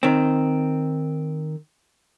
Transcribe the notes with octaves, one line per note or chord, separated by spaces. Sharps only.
D#3 C4